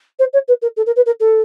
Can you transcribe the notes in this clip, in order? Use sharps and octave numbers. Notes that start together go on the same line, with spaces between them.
C5
C#5
B4
A#4
A4
A#4
B4
A#4
A4